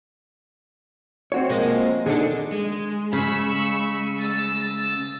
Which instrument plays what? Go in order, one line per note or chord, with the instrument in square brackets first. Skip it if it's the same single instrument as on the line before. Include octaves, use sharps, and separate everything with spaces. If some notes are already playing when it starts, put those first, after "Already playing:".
[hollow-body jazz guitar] C4 F#4 C#5
[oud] F3 G#3 A#3
[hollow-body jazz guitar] D3 D#3 G#4 [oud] G#3 D4 A4
[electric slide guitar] G#3
[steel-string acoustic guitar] C#3 [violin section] B5 C#6 E6
[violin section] E6 A6